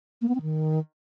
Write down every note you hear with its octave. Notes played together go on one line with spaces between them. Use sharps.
A#3
B3
C4
D#3